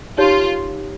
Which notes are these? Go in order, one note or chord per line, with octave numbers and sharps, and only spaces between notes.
D#4 F4 G4 C#5